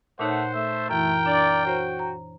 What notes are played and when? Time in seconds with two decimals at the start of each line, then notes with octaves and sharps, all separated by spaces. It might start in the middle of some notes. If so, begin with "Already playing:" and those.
0.19 A#2 A3 D#4 C5 C#5 F#5
0.55 A3 E5
0.89 F#2 E3 E4 A#4 G5
1.26 A#3 D4 D5
1.65 F#4 C5 C#5
1.99 A#5